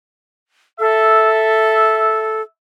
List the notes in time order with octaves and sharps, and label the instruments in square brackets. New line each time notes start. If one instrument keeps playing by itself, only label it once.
[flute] A4 [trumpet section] E5